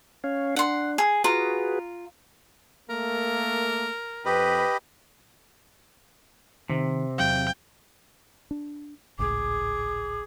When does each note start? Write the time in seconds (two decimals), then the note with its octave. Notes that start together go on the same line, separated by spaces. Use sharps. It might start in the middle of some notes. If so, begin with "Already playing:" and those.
0.24 C#4 C#5 F5
0.56 D4 F#5 C6
0.98 G#4
1.24 F4 F#4 G#4 B4 A#5
2.90 A3 A#3 A#4
4.26 F2 G4 B4 D#5 B5
6.70 C3 D#3
7.18 E2 F#3 F5 G5
8.51 D4
9.19 G#1 C#2 A2 G#4 D6